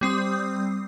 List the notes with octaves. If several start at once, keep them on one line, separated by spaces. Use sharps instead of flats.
G3 C4 D#6 C7